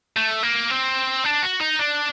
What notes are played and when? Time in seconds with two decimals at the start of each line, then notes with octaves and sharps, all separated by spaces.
0.16 A3
0.43 A#3
0.71 C4
1.25 D4
1.43 F#4
1.61 D#4
1.79 D4